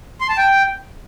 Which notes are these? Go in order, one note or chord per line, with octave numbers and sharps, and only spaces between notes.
C6
A5
G5